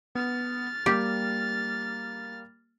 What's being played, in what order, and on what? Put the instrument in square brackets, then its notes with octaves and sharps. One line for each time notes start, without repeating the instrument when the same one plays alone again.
[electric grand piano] B3 [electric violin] F6 A6
[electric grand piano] G3 A#3 [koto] G4